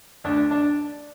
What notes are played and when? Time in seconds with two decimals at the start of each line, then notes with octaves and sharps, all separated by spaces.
0.24 D2 D4
0.51 D4